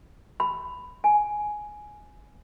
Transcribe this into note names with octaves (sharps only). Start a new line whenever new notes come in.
B5
G#5